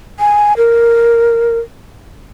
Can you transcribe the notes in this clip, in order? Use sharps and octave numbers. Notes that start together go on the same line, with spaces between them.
G#5
A#4